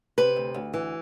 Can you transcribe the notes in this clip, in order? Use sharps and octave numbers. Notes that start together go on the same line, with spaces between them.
C3 B4
D2
D2
E3